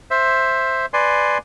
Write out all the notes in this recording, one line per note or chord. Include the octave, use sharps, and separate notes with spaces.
C5 E5
B4 D5 G#5 C6